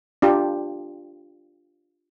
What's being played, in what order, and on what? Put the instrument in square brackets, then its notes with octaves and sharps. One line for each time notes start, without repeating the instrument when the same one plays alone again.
[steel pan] D4 F4 G4